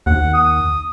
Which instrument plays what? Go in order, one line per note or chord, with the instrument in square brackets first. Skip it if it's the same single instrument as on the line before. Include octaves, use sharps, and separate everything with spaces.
[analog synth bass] D#2 [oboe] F#5
[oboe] D#6